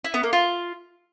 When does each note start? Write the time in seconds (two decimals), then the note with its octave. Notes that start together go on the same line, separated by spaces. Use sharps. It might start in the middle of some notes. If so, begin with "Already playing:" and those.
0.04 E4
0.14 B3
0.23 A#3
0.33 F4